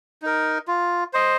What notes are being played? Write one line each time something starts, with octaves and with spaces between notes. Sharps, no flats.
D#4 A#4
F4
C5 D#5